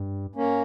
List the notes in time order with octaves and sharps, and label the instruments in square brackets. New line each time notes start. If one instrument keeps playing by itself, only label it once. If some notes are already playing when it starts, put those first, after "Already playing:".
Already playing: [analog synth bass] G2
[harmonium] A#3 C#4